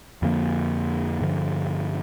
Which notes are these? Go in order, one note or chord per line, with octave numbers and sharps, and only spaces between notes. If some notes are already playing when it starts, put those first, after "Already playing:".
F2 D3 F3 A#3
G2 D3 F3